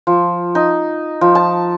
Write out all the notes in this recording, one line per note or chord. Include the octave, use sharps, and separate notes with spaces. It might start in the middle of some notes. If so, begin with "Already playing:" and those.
F3
D#4
F3
A5